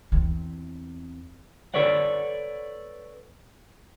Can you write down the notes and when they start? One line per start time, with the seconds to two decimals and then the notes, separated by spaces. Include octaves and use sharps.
0.12 E2 C4
1.74 A4 B4 C#5 D5 F#5